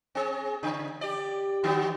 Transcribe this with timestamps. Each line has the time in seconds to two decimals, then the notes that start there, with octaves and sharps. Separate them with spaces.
0.15 C4 G#4
0.63 C#3
1.01 G4 D5
1.63 D3 F#3 B3